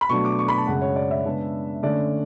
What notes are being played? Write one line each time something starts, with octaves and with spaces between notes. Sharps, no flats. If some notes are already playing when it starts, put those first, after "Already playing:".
B5
B2 F#3 A3 D4 C#6
D6
C#6
B5
A5
F#2 C#3 G#3 F#5
C#5
D5
E5
C#3 G#3 B3 D4
D3 A3 C#4 D5